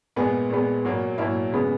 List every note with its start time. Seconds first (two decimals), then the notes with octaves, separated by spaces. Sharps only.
0.16 A#2 G#3 B3 G#4
0.50 A#2 G#3 B3
0.85 A#2 F#3 A#3
1.18 A#2 F#3 A#3 E4
1.52 C#3 G#3 B3